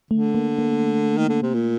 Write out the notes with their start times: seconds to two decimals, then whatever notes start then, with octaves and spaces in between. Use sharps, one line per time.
0.11 D3 A3
0.35 A#3
0.59 A#3
1.17 D#3
1.29 D3
1.42 C3
1.54 A#2